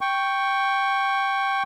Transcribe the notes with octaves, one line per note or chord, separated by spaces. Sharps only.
G5 C#6